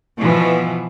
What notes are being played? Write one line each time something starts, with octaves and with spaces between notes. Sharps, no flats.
B2 E3 F3